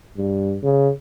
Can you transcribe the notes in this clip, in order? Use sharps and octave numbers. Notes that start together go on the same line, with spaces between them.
G2
C#3